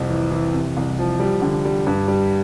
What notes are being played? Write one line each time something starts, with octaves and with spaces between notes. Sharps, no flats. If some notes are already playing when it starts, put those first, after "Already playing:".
Already playing: C2 F2
E3
E3
C3
C2
F3
G3
D3
G3
G2
G3